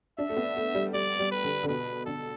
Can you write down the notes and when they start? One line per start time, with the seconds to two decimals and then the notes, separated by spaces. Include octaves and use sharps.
0.18 D4 E5
0.29 A3
0.37 B3
0.56 A3
0.74 G3
0.94 G3 D5
1.19 G3
1.32 B4
1.44 D3
1.63 D3
1.68 B2 B4
2.06 D3 A4